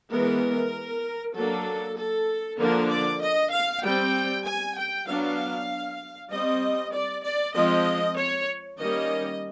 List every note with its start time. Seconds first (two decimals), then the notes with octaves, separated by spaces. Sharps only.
0.10 E3 G#3 B3 A#4
1.34 F#3 A#3 D4 A4
1.97 A4
2.58 D3 F3 A#3 D4 A#4
2.89 D5
3.20 D#5
3.51 F5
3.82 G3 C4 G5
4.45 G#5
4.76 G5
5.07 F#3 B3 D4 F5
6.31 G3 C4 D#5
6.93 D5
7.24 D5
7.55 F3 G#3 C4 D#5
8.17 C#5
8.79 D#3 G3 A#3 C#4 D#5